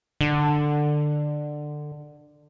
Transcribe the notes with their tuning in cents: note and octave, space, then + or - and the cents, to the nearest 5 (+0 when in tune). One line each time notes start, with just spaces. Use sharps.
D3 +15